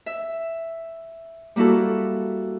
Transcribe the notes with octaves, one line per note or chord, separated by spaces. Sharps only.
E5
G3 A#3 E4 F#4 A4